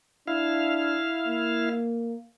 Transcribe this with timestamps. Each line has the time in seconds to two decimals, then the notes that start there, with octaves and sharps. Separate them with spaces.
0.27 D4 E4 F5
1.27 A#3